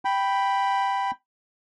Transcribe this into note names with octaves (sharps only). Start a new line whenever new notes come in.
G5 B5